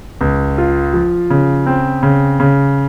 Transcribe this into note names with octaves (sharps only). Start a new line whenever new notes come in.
C#2
F4
F3
C#3
C4
C#3
C#3